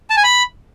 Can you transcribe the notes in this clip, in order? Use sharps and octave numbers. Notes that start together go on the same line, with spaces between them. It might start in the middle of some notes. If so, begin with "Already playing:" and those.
A5
G#5
B5